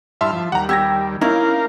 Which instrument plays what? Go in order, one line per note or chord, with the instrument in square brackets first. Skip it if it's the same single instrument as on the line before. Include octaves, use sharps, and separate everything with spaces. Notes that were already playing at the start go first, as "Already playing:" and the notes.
[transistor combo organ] G2 E4 F6 [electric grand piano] E5 A5 C6
[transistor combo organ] F3
[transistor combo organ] D#2 G3 [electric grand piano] F#5 A#5
[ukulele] G4 [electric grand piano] E6 G#6 A#6
[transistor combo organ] A#3 A#4 F5 [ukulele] C#4 E4 [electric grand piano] D#4